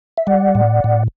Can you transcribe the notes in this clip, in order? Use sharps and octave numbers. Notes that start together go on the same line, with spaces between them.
E5
G3 D5 F#5
A2
A2